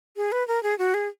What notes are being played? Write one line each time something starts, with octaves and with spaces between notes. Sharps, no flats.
G#4
B4
A#4
G#4
F#4
G#4